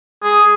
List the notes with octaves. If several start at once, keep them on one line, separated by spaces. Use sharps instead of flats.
G#4